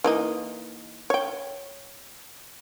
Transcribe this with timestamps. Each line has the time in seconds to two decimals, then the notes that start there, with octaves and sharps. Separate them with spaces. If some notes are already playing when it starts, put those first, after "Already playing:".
0.04 E3 A#3 D#4
1.10 C#5 G5